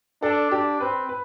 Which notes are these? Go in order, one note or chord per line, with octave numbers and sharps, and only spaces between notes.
D4 A4
D4 G4
C4 B4
B4